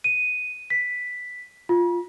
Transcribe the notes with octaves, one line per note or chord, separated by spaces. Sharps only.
D#7
B6
F4